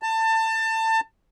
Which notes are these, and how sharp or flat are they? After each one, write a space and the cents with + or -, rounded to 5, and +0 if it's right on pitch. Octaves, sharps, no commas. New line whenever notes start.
A5 +25